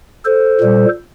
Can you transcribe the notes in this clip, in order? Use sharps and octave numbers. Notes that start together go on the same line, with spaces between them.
A4 C5
A#2 G3